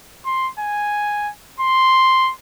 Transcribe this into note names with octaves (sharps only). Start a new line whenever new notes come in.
C6
G#5
C6